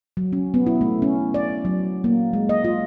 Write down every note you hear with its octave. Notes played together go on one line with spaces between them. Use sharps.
F#3
C#4
B3
E4
A3
C#4
D5
F#3
A#3
G#3
D#5
F4